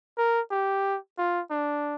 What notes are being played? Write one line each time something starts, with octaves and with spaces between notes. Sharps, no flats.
A#4
G4
F4
D4